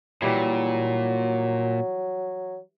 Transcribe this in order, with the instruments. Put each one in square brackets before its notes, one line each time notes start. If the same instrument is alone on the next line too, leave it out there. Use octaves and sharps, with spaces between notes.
[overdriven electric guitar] A#2 [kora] E3 G3 E4 [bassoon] F#3